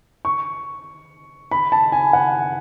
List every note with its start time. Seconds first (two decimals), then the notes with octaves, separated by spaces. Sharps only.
0.25 C#6
1.51 B5
1.72 A5
1.92 G#5
2.13 F#5